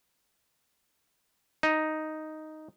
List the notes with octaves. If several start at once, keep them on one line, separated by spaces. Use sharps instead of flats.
D#4